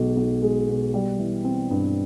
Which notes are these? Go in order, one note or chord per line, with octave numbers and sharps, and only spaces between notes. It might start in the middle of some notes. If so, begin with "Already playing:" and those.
Already playing: B1 B2 G#3
B1
G#3
B2
G3
E3
C4
G2